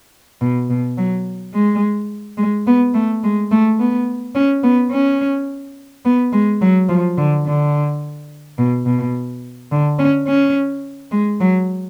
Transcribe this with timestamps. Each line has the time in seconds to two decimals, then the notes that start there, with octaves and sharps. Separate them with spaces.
0.41 B2
0.70 B2
0.98 F#3
1.54 G#3
2.38 G#3
2.67 B3
2.94 A3
3.23 G#3
3.51 A3
3.79 B3
4.35 C#4
4.63 B3
4.91 C#4
6.05 B3
6.33 G#3
6.61 F#3
6.89 F3
7.17 D3
7.46 D3
8.58 B2
8.86 B2
9.71 D3
9.99 C#4
10.27 C#4
11.11 G#3
11.40 F#3